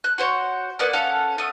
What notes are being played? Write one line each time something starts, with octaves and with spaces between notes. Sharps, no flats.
F#6
F#4 C5 C#5
A#3 B3 D5 F#5
C#4 A4 F5 F#5
A3 C#4 D#6